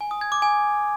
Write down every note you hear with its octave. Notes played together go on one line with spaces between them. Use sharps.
G#5
D#6
G#6
D6
G#5